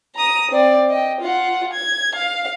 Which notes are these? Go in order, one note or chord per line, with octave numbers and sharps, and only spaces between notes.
A#5 D#6
C4 D5
D#5 G5
F4 F#5
G#6
F5